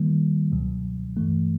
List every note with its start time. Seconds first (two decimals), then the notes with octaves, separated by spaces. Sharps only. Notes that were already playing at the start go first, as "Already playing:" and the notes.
Already playing: D#3 G3 A#3
0.52 C#2 B2 F#3
1.17 G2 E3 A3